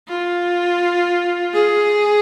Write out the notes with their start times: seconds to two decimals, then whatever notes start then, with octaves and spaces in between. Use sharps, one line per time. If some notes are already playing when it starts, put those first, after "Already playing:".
0.09 F4
1.54 G#4